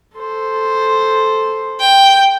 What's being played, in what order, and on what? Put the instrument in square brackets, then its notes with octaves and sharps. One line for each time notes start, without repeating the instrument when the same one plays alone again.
[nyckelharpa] A4 C5
[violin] G5